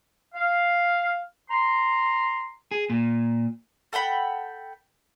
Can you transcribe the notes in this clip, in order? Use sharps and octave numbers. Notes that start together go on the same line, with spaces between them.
F5
A#5 C6
G#4
A#2
A4 F#5 G5 B5